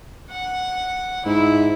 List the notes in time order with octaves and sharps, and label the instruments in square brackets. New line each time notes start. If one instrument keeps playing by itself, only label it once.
[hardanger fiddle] F#5
[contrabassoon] G#2 [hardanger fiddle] E4